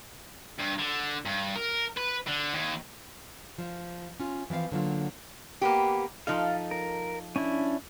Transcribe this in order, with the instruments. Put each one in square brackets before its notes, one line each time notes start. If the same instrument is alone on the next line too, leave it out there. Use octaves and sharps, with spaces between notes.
[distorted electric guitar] G2
D3
G2
A#4
B4
D3
D#2
[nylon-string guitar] F3
C#4 F4
E3 F3 C4 F5
D3 F#3 A#3 F4
[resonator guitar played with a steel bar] A#3 B3 G4
[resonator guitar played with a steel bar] F3 D#4 A4 [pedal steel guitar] F5
[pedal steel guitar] A#4
C#4 D4 E4